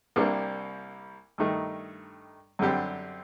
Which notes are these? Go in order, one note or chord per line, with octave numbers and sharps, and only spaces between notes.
C2 C3 G3 A#3 D4
G2 D#3 A3 D#4
F#2 D3 G3 C4 G4